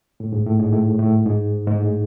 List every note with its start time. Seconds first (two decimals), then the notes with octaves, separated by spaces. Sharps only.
0.20 A2
0.33 G#2
0.46 A2
0.59 G#2
0.73 A2
0.99 A2
1.25 G#2
1.67 G#2
1.78 A2